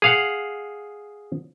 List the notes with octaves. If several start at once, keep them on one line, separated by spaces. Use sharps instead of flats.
G#4 F5 F#5